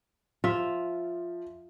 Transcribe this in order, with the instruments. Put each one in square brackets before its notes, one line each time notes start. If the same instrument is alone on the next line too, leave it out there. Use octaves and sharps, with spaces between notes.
[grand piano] F3 [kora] F4 E5